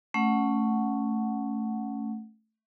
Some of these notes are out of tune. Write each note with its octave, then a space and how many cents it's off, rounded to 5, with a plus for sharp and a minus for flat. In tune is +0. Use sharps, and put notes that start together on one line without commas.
A3 +0 C#4 +0 F#5 +0